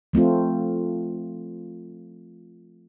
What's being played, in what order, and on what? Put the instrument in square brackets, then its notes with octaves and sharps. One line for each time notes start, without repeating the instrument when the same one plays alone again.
[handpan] F3 A3 C4 F4